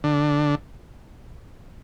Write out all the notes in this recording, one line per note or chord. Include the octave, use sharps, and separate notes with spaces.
D3